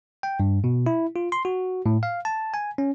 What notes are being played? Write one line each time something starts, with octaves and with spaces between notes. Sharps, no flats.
G5
G2
B2
E4
F4
C6
F#4
A2
F5
A5
G#5
C#4